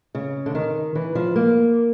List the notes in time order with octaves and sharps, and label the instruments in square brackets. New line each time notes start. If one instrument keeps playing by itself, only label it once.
[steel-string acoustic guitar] C#3
D3
D#3
E3
F3
A#3